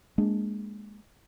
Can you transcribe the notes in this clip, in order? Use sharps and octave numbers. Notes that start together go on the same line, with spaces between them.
G#3 A#3 D4